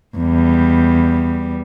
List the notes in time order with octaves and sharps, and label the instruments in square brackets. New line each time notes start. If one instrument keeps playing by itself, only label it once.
[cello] E2 G3